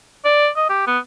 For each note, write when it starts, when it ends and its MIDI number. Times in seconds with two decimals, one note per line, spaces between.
0.25 0.48 74
0.57 0.69 75
0.69 0.83 67
0.87 0.98 59